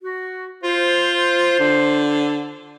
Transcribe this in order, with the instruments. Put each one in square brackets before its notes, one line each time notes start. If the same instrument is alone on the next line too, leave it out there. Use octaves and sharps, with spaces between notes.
[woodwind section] F#4
[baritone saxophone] F4 [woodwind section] C5
[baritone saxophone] D3